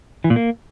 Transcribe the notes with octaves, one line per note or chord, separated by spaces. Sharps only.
E3
A#2
A#3